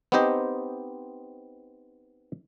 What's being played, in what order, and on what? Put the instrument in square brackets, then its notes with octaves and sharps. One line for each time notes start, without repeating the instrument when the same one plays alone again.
[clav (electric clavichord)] B3 C4 D#4 G4 C5 D#5